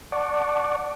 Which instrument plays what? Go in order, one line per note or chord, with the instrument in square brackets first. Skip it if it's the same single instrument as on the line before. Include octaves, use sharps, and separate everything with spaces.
[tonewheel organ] D5 F#5 A5 C#6 D6